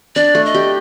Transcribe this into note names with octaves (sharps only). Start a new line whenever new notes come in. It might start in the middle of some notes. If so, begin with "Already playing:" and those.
D4 D5
A3
D#5
G4